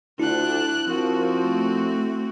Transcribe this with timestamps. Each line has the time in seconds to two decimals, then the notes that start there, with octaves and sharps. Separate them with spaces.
0.20 D2 D4 E4 F4 F#6
0.88 F3 C4 F#4 A#4
1.42 A3